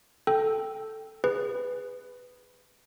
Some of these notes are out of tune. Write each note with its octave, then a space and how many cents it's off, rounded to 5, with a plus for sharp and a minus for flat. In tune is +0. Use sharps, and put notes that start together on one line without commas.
A4 +0 G5 +0
G#4 -10 B4 +10